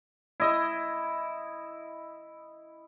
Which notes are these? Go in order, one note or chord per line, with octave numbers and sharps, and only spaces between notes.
E4 D#5